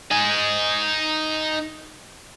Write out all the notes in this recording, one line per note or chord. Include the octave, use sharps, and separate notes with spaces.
D#4 G#5